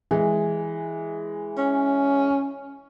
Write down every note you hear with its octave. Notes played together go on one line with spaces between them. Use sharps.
E3 G#3
C#4